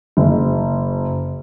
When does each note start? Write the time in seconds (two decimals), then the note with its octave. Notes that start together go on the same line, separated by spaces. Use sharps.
0.17 F#1